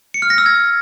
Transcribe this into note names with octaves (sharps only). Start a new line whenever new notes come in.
C#7
F6
A#6
E6
G#6